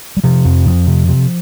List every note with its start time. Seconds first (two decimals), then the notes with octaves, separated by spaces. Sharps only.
0.17 G3
0.24 C3 F3
0.45 F2
0.66 F2
0.87 C3
1.09 C3